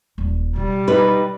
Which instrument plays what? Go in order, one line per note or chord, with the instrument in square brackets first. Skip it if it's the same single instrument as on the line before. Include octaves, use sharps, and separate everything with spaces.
[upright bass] D#1 G3
[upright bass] B2 [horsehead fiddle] G3
[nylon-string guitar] D#4 B4